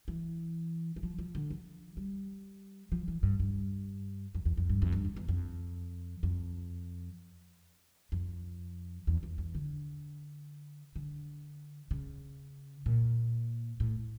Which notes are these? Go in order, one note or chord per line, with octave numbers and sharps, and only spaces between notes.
E3
E3
F3
F3
D3
F3
G3
F3
E3
G2
G2
F2
E2
F2
G2
F2
G2
F2
E2
F2
F2
F2
E2
E2
E2
D3
D3
C#3
A#2
A2